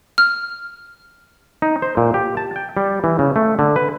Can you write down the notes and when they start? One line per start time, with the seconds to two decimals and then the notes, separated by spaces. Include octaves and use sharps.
0.18 F6
1.62 D#4
1.82 C5
1.97 A#2
2.14 G4
2.37 A5
2.56 G5
2.77 G3
3.04 E3
3.19 C#3
3.36 A3
3.59 D3
3.76 B4